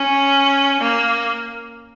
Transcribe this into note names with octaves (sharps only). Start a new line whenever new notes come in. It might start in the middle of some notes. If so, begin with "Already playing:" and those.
Already playing: C#4
A#3